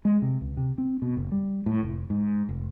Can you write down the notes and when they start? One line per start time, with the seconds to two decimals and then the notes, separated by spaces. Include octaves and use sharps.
0.05 G#3
0.22 C3
0.41 C#2
0.57 C3
0.78 C4
1.02 B2
1.17 F#1
1.32 G3
1.66 A2
1.83 F1
2.10 G#2
2.49 F1